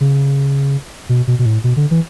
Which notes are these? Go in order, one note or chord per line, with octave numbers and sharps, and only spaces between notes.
C#3
B2
B2
B2
A2
B2
D3
E3